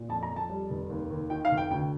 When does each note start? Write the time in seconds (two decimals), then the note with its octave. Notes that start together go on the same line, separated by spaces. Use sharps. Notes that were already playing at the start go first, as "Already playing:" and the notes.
Already playing: A#2
0.09 F2 A5
0.23 A#5
0.29 F2
0.36 A5
0.50 G3
0.70 F1
0.90 D#2
1.11 D#2
1.30 D#3 G5
1.45 F5
1.51 F1
1.57 G5
1.71 D2 G5